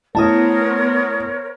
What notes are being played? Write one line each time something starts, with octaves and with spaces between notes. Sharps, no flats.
A3 B3 E4 A#4 C5 C#5 A5 D#6